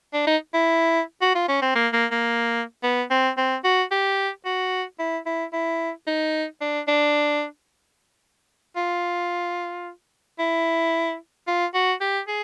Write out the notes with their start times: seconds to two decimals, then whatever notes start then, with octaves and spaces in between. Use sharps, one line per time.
0.14 D4
0.27 D#4
0.54 E4
1.22 F#4
1.35 F4
1.49 C#4
1.62 C4
1.76 A#3
1.93 A#3
2.12 A#3
2.83 B3
3.11 C4
3.37 C4
3.64 F#4
3.91 G4
4.45 F#4
4.99 E4
5.26 E4
5.53 E4
6.07 D#4
6.61 D4
6.88 D4
8.77 F4
10.39 E4
11.47 F4
11.74 F#4
12.01 G4
12.28 G#4